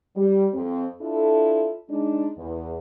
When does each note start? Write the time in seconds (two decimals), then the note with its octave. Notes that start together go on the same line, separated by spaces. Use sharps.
0.16 G3
0.54 F2 C4
1.00 D4 E4 F4 A4
1.90 G#3 D4 D#4
2.37 E2